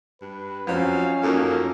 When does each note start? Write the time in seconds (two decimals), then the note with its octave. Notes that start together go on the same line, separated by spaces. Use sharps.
0.21 G2 B4
0.67 F2 F3 F#3 C4 C#4 F5
1.23 F#2 F3 A#3 D#4 A4